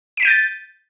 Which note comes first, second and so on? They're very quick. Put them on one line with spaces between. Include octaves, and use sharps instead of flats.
D7 B6 D#7 G6 A6